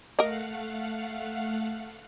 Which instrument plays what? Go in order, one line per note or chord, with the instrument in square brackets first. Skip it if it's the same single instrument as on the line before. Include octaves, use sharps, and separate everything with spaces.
[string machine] A3 F5 F#5 [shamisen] A#4 D#5